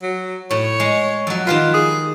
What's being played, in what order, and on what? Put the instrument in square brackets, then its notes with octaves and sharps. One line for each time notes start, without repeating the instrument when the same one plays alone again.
[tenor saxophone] F#3
[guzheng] A2 [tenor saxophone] C#5
[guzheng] G#3
F2 F#3
[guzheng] D#3 G4 B4 [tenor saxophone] F4
[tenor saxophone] G#4